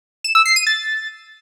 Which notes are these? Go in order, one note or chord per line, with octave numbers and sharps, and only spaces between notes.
E7
E6
C7
D#7
A6